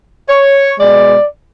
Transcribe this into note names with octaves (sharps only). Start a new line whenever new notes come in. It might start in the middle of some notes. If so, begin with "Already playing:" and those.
C#5
B2 G#3 D5